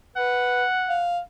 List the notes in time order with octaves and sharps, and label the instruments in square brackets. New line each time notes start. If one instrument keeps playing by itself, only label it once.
[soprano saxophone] B4 [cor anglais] F#5
[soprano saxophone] F5